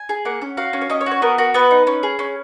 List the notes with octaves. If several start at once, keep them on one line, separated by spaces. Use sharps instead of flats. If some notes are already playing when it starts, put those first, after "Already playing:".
Already playing: G#5
G#4
A#3 F#5
C#4
F#4 F5
C#4
C#5
C#4 D#5
C#5
F#4
C#5
B3 A#4
F#4 A#4
B3 B4
D#4
C#4
G#4
C#4